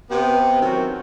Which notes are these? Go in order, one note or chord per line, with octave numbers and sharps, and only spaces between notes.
C3 B3 G5
D#3 E3 F#3 C4 C#4 F#4